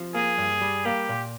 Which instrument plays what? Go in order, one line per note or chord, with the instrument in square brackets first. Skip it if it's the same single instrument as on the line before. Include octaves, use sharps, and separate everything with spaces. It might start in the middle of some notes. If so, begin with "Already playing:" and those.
Already playing: [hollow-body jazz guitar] C3 F3
[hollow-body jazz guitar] A#3 [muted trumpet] G#4
[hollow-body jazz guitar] G2
G3
[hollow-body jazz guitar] A#3 [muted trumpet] G4
[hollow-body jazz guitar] A#2